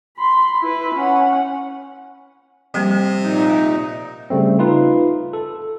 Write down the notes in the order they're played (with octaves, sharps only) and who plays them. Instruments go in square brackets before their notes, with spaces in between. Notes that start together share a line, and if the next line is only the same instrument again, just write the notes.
[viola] B5 C6
E4 B4
C#4 F#5
[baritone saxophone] C3 [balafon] F3 G3 A#3
[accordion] A#2 D#4
[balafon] E5
[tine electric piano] C#3 G3 A3 C4
D#4 F4 B4
A4